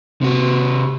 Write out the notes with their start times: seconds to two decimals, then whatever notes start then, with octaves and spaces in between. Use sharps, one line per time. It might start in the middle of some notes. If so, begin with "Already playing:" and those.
0.21 C3 F#4